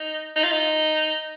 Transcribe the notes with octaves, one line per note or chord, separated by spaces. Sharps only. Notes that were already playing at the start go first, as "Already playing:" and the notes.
Already playing: D#4
D#4
F4
D#4